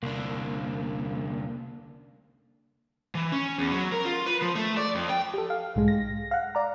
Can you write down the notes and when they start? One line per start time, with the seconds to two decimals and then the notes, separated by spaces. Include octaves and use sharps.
0.03 C2 D3 A#3 D4
3.15 E3
3.32 C#4
3.58 E2
3.72 F#3
3.92 A#4
4.05 F4
4.26 B4
4.42 F3
4.55 A3
4.77 D5
4.95 F2
5.09 G5
5.34 G4 A4
5.50 F5
5.75 B1 G#2 G#3
5.88 A#6
6.31 F5 F#5
6.55 D5 A#5